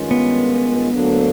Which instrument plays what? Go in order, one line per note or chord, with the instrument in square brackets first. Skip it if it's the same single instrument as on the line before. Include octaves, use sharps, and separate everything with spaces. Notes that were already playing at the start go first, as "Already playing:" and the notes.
Already playing: [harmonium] G2 D#3 G#3 C#4 F4
[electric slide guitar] B3
[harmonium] D2 D3 F#3 A#3 D4